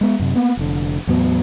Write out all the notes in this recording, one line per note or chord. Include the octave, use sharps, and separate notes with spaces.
G#3 B3
F#2 C3
A#3 B3
F1 D3
E2 A2 F#3 B3